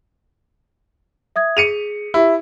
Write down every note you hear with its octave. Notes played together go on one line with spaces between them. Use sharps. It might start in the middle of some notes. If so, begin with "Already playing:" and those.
E5 D#6 G#6
G#4 C#7 D#7 F7
E4 G4 E5